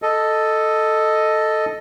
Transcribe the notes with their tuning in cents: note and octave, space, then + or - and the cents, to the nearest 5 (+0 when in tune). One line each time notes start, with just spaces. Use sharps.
A4 +0 D#5 +0